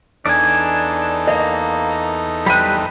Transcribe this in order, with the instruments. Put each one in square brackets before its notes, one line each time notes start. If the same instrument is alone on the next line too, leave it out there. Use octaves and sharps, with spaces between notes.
[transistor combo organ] E2 D#4 A4 [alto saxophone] D4 [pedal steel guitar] D5 G#5
[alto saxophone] A#3 [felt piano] D#5
[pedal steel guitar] G3 B4 [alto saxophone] C4 [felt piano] B5 G6 D#7